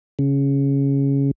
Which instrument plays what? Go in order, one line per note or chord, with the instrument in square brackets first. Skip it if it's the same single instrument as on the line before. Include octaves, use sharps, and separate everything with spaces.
[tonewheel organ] C#3